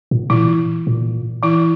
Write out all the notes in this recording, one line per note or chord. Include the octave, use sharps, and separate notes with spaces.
A#2
A#2 E3 E4
A#2
E3 E4